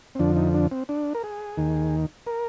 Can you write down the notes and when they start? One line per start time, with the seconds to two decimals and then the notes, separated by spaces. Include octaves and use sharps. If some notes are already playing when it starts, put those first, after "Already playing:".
0.15 C4
0.19 F2 D3 F3 D4
0.36 D#4
0.54 D4
0.71 C4
0.89 D4
1.15 A#4
1.24 G#4
1.57 D#2 D#3
2.27 A#4